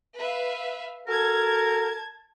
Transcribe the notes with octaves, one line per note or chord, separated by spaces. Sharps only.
B4 E5 F5
F#4 A4 A#4 A5 G#6